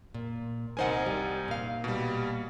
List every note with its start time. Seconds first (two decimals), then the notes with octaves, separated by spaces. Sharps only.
0.14 A#2
0.77 C2 D#4 A#4 C5 F#5 G#5
1.06 G3
1.48 A#2 F5
1.84 B2 G3